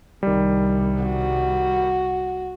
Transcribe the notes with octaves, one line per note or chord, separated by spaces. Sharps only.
C2 C3 D#3 G3
F#4